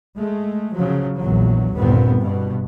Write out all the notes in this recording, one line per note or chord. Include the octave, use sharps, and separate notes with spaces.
G#3 A3
C#3 F3 F#3
A#1 E2 F#3
G1 D#2 A#2 B3 C4
G2 B2